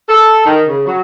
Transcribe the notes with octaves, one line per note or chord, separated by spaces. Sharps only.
A4
D#3
C#3
F#3